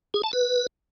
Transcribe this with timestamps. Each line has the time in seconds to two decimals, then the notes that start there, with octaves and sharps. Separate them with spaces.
0.14 G#4
0.23 A5
0.33 B4